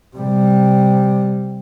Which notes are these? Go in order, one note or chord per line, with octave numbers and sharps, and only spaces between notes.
C3 G3